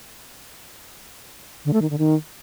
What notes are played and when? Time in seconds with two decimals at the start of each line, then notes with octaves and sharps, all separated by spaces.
1.65 D3
1.73 A3
1.82 D#3
1.90 D3
1.98 D#3